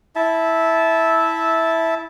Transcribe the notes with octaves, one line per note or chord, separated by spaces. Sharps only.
E4 E5 A5